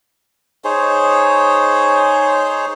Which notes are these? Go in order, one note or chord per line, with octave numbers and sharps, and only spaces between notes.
D#4 G#4 C5 C#5